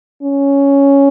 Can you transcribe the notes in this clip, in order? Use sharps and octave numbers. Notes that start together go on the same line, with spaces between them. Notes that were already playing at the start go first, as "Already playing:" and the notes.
C#4